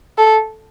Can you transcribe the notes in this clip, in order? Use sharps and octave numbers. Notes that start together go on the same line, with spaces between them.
A4